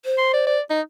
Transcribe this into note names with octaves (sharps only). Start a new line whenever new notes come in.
C5
C6
D5
D5
D#4